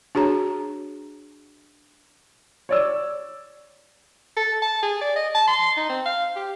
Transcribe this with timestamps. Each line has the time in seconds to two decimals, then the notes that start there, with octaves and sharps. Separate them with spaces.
0.15 D4 F#4 G#4 C#5 A#5
2.69 C#5 D5 E6
4.36 A4
4.62 A5
4.83 G#4
5.01 D5
5.16 D#5
5.35 A5
5.47 C6
5.77 D#4
5.89 C4
6.06 F5
6.36 G4